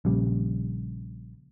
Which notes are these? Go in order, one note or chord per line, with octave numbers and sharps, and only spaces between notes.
A#1 C#3 G3